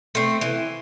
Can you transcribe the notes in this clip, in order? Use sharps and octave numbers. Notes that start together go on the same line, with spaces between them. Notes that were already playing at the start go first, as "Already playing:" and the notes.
A3 C4
E3